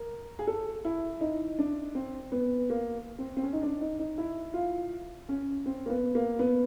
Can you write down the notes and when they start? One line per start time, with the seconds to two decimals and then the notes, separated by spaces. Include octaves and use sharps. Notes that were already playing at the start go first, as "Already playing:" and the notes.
Already playing: A#4
0.39 G#4
0.47 A4
0.85 E4
1.21 D#4
1.59 D4
1.95 C4
2.32 B3
2.70 A#3
3.18 C4
3.37 C4
3.43 C#4
3.53 D#4
3.62 D4
3.81 D#4
3.99 D#4
4.18 E4
4.54 F4
5.29 C#4
5.66 C4
5.86 A#3
5.89 B3
6.15 A#3
6.39 B3